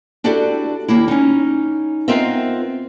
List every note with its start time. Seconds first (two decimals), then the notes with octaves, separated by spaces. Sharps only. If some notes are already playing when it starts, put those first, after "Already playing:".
0.24 D4 E4 F#4 G4 A4 D5
0.88 D#2 A#3 E4
1.08 C#4 D#4
2.08 B3 C4 F4 A#4 D#5 E5